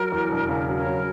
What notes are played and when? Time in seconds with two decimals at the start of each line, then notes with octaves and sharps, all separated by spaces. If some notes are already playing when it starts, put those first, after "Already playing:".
Already playing: F#3 A#4
0.12 E2
0.31 E1
0.49 C#3 A#4
0.68 F#3
0.77 A#4 C#5
0.86 F#3